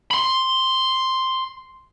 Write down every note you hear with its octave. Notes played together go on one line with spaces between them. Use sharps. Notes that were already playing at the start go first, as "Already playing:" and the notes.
B5 C6